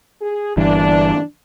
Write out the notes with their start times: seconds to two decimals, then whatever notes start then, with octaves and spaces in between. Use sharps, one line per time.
0.22 G#4
0.57 G1 G2 E3 D4